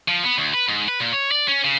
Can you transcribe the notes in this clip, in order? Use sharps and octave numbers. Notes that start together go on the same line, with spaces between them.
F3
B3
D2
B4
G#2
B4
A#2
C#5
D5
C#4
C#3